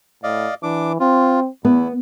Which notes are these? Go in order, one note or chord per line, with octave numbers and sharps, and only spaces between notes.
A2 D5 D#5 F5
E3 D4 D6
C4 F4
E2 B3 E4